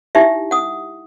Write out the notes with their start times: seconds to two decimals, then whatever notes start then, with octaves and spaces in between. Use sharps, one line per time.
0.15 D#4 E4 G4 E5
0.51 F#5 D#6